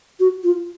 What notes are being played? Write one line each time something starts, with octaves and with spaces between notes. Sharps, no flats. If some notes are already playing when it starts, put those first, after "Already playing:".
F#4
F4